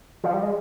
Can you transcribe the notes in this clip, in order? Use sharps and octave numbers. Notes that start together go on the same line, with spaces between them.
F3
G3
G#3